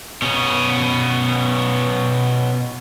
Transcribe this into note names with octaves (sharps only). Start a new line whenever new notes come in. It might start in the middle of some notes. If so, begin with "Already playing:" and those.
B2 C#4